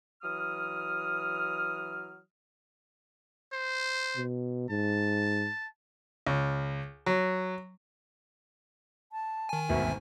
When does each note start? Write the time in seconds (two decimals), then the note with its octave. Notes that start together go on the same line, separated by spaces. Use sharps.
0.22 E3 F#3 D#6 F6
3.53 C5
4.16 B2
4.70 G#2 A5
6.27 C#2
7.06 F#3
9.12 A5
9.49 D#3 G#5
9.69 G#1 D2 B2 E5